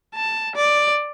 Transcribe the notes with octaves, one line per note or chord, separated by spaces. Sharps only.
A5
D5